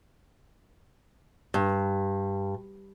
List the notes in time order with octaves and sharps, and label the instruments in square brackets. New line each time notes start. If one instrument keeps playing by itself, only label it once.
[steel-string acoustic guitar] G2